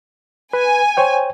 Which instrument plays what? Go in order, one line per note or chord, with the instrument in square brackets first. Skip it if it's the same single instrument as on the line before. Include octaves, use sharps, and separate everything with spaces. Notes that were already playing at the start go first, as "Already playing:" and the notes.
[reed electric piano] B4 [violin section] G#5
[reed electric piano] C5 C#5 G5